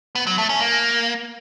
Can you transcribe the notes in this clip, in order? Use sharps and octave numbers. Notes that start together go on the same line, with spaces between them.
B3
F#3
A3
C#4
A#3